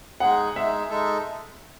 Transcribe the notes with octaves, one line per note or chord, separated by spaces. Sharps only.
G#3 D#4 G#4 F#5
G#3 D#4 G#4 E5
G#3 D#4 A4